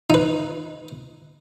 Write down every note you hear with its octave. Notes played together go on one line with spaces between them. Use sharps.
D#4 B4